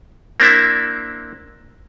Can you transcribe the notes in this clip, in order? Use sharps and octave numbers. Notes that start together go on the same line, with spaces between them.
A#3 C4 D4 E4 E5